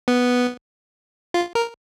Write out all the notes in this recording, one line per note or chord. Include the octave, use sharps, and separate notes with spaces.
B3
F4
A#4